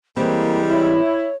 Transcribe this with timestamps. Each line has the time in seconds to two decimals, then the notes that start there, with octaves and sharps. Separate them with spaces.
0.17 E3 G3 G#3 A#3 C4
0.71 E4 C#5